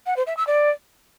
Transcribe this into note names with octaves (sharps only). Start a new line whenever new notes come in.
F#5
C5
E5
E6
D5